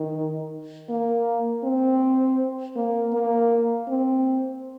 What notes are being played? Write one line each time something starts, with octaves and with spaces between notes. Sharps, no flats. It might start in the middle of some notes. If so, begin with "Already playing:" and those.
Already playing: D#3
A#3
C4
A#3
A#3
C4